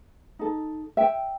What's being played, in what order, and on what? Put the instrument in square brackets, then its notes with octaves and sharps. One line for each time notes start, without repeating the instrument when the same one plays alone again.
[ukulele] D#4 A4
E5 G5